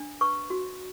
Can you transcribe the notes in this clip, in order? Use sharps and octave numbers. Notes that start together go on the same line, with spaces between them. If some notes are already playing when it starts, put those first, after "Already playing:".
Already playing: D4
B4 C#6
F#4